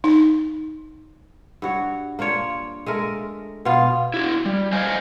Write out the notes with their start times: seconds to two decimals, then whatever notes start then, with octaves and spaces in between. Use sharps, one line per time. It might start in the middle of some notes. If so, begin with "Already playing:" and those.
0.04 D#4
1.62 G2 F#4 C#5
2.19 A#3 D4 F4 C#5
2.86 G#3 A3 A#4
3.65 B2 B3 F4 F5
4.14 E4 F#4
4.45 G3
4.72 C5 D#5 F5 G#5